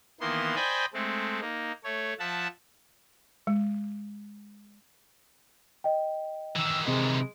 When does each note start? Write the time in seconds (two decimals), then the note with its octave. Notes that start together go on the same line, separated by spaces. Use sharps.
0.20 D#3 E3 A#3 B3 C6
0.55 C5 D5 D#5 G5 G#5 B5
0.93 G#3 A3 C4
1.41 A#3 D#4
1.84 A3 C#5
2.19 F3 E5 F#5 A5
3.47 G#3
5.84 D#5 G5
6.56 D#3 E3 E6
6.87 C3 G#3